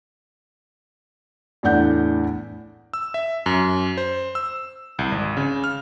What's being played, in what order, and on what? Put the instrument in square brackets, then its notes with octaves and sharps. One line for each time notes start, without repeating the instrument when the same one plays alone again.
[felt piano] E2 A2 D4 F#5 G6
[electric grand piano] E6
E5
F#2
C5
E6
C2
G#1
C#3
F6